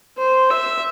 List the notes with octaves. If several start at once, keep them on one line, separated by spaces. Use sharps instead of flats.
C5
E5